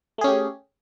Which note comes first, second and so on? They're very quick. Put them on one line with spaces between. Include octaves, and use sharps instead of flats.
A3 G#4 C#4 G4